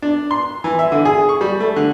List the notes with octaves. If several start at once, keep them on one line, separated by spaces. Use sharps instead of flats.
D4
C6
E3
E5
D3
G#4
C#6
G3
A3
D3